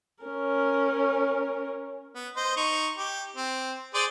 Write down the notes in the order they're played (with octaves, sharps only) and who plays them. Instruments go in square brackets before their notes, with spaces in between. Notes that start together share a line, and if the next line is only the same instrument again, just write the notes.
[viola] C#4 A#4
[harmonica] B3
C5 D#5
D#4 C#6
G4
C4
G#4 C5 D5